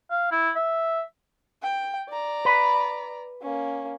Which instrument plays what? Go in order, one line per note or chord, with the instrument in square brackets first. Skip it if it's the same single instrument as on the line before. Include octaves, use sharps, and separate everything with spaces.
[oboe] F5
E4
E5
[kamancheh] G5
D5 A#5
[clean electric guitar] B4
[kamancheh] A#3 C#4